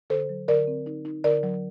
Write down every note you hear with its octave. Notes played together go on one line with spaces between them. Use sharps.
D3 A4 C5
F#3
D3 A#4 D5
C4
D#4
D#4
D3 A#4 D5
F#3